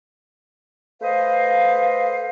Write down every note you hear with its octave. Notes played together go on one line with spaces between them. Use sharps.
A3 B4 C5 D#5 F5